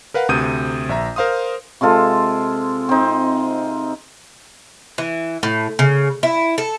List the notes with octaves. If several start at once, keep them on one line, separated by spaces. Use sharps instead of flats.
A#4 B4 F5 F#5
D2 C3 D#6 G6 D#7
A#1 E5 A#5
A#4 C5 F5 C6 D#6
C3 G#3 F4 A4
C4 D#4
E3
A2
C#3
E4
A4